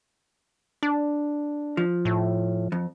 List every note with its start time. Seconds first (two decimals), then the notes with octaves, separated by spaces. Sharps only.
0.83 D4
1.77 F3
2.05 A2
2.72 F2